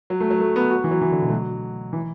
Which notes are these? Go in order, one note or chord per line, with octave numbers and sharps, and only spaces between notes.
F#3
A3
F#3
A3
B3
F#4
E3
F#3
E3
D3
B2
A3
F#3
E3